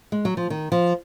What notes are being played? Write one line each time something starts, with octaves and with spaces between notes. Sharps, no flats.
G#3
F#3
F3
D#3
F3